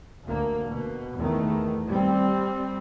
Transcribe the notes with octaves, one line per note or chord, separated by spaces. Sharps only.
D2 A#3
B2
E2 D#3 A3
G3 C4